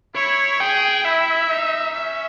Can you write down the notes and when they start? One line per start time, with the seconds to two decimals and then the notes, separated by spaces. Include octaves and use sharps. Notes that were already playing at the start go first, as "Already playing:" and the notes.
0.15 E4 C#5
0.60 G#4 G5
1.04 E4 E5
1.49 D#4
1.93 C#4 E5